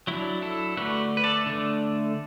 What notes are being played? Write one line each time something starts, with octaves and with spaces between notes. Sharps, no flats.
F#3 D4 E4
E4 A4
D3 A3 D4 F#4 B4
B4
A4 D5
D3 A3 D4